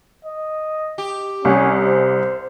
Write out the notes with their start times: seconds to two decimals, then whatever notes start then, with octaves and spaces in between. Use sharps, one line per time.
0.25 D#5
0.98 G4
1.45 C2 C#4
1.84 C5